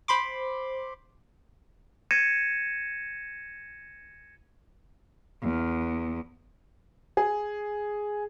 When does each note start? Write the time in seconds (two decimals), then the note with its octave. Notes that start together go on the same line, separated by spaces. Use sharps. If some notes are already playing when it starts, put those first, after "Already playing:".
0.08 C5 B5 C6 D6
2.11 G#6 A#6 C#7 D#7 E7
5.41 E2
7.17 G#4